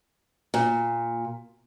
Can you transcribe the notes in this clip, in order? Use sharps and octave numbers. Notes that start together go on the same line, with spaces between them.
A#2